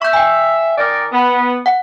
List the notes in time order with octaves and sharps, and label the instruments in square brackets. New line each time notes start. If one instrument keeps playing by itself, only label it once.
[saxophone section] E5 [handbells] C#6 G6
[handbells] G5 G#5
[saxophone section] D#3 A#4 D5
B3
[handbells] F#5